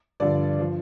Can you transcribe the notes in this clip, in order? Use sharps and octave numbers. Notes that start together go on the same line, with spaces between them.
G2 D3 F3 D5
F3